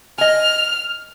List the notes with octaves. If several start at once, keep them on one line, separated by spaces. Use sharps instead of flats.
D#5 G#5 F6